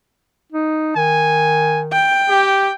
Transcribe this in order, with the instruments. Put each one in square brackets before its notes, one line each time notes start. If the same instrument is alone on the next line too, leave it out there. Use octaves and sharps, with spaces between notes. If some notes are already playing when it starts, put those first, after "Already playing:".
[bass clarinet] D#4
[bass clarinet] D#3 [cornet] G#5
[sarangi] G5
[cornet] G4